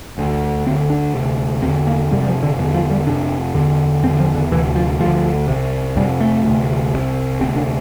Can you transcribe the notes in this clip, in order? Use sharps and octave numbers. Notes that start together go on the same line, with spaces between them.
D2 D3
D2 D3 C4
D4
D2 C3
E2 D3 C4
A#3
F2 C3 G3
G3
F3
D3
E2 D3 E3
F3
G3
F2 C3 D4
E2 D3
E2 D3 C4
F3
D3
D2 C3 E3
F3
D2 D3 F3
C2 C3
F2 C3 G3
A3
D2 C3
C2 C3
D2 C3 C4
D4